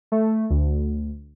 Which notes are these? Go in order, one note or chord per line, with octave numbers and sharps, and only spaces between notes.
A3
D2